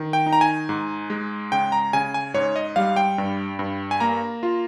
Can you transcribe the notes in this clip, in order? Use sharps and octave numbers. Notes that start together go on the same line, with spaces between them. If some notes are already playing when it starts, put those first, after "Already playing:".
Already playing: D#3
G5
D#4
A#5
G#5
G#2
G#3
C#3 G5
A#5
C#3 G#5
G#5
G#2 C#5
D#5
G3 F5
G5
G2
G2
G#5
A#3 A#5
F4